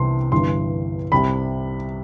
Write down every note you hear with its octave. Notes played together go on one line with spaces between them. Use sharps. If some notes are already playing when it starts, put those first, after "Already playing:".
Already playing: C2 C3 E3 B3 C6
G1 G2 E3 C6
C2 C3 G3 B5